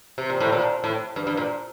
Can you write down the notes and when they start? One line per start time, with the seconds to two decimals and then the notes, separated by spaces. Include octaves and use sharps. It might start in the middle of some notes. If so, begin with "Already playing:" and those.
0.18 C3
0.30 A#2
0.40 A2
0.52 A#2
0.84 A2
1.16 G2
1.27 G2
1.37 A#2